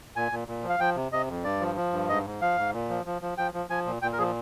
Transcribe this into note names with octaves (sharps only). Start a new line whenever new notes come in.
A#2 G#5
A#2
A#2
F3
F5
F3 G5
C3
C3 D#5
F2
G2 D5
F3
F3
G2
G#2 D#5
G#2
F3 F5
G#2
A#2
F3
F3
F3
F3 G5
F3
F3 G#5
A#2
A#2 G5
A#4
F3 G#4